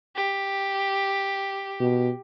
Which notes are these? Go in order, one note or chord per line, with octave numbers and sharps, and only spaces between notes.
G4
B2